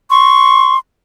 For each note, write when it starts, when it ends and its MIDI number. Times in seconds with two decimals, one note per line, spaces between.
0.10 0.78 84
0.10 0.75 85